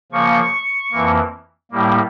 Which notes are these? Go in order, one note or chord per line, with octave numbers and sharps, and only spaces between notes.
C#3 F3 A#3 C#6
F2 E3 A#3
A2 G3 A#3